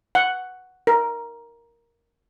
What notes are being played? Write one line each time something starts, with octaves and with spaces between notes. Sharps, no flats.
F#5
A#4